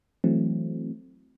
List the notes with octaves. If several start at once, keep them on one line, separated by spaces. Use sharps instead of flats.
E3 F#3 A3 C4